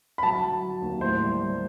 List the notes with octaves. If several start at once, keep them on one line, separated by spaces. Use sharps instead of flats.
B5
F#3 A5
F#3
F#3
D#2
A2 C5
G3
G3